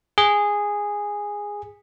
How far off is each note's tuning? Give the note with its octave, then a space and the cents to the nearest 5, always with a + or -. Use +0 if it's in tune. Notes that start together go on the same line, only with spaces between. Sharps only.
G#4 -10